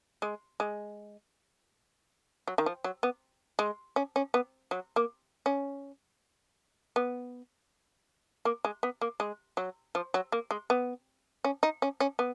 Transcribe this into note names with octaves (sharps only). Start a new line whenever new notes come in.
G#3
G#3
F#3
D#3
F3
F#3
B3
G#3
C#4
C#4
B3
F#3
A#3
C#4
B3
A#3
G#3
B3
A#3
G#3
F#3
F3
F#3
A#3
G#3
B3
C#4
D#4
C#4
C#4
B3